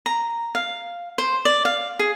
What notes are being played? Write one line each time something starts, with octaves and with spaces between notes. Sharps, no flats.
A#5
F5
C5
D5
F5
G#4